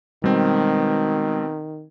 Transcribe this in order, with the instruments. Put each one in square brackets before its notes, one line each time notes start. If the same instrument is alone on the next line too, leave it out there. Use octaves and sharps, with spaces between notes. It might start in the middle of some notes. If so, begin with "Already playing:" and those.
[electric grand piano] B2 C4 [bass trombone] D#3 [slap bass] G3 G#3